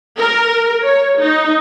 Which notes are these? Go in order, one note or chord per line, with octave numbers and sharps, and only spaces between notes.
A#4
C#5
D#4